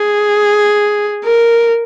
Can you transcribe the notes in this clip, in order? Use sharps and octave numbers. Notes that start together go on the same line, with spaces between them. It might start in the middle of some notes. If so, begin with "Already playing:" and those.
Already playing: G#4
A#4